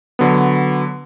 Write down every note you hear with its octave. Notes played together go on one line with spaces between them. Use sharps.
D3 F#3 B3